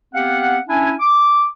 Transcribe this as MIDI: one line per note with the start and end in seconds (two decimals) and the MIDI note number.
0.15 0.57 59
0.15 0.57 60
0.15 0.57 67
0.15 0.57 77
0.15 0.57 78
0.69 0.92 61
0.69 0.92 62
0.69 0.92 64
0.69 0.92 76
0.69 0.92 80
0.99 1.45 86